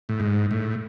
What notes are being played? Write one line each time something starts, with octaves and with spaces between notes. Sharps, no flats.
A2
G#2
A2